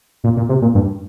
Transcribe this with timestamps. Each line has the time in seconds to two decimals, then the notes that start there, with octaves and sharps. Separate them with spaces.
0.24 A#2
0.37 A#2
0.49 C3
0.62 A#2
0.75 G2